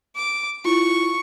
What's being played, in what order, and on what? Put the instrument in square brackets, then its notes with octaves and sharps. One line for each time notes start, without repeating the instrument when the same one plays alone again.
[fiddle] D6
[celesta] E4 F4 [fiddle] C#6